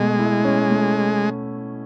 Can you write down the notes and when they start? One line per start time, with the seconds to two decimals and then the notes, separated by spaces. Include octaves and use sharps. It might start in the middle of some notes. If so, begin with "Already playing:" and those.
Already playing: B2 G#3 A3
0.19 E4
0.44 C#4
0.71 A3